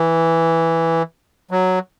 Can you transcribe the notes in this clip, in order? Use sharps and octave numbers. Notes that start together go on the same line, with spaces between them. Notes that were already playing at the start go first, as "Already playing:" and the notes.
Already playing: E3
F#3